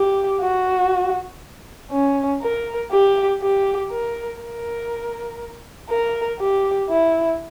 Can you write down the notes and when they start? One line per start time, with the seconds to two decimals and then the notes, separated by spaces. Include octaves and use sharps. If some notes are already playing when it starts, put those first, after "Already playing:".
Already playing: G4
0.41 F#4
1.91 C#4
2.42 A#4
2.92 G4
3.41 G4
3.91 A#4
4.41 A#4
5.90 A#4
6.39 G4
6.89 E4